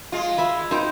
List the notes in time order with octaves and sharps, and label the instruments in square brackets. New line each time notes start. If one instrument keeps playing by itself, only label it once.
[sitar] G#3 F4
[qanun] E5 B5
D#4 C5 G5